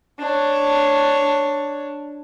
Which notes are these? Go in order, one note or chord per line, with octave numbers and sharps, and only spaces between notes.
D4 C#5